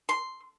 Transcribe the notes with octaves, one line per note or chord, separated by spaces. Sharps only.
C6